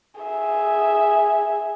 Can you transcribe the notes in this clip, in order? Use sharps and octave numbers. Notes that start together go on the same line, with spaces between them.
G#4 E5